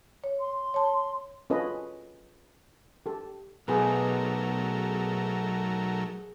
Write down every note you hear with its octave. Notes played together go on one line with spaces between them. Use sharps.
C#5
C6
C#5 A5
C#4 F4 A4 B4 D#5
G4 A4
B1 F#3 A3 G#4 A#4 B4